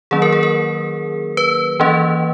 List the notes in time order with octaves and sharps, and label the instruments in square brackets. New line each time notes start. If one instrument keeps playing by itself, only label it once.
[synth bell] D#3 F#3 A#3 C#4 G#4
A#4
G#4
A#4
B4
E3 A#3 C#4